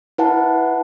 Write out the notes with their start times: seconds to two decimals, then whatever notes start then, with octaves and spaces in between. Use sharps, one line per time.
0.18 E4 B4 F#5 A5